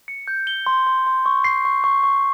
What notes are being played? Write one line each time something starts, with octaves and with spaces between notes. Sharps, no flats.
C#7
G6
G7
C6
C6
C6
C#6
C7
C#6
C#6
C#6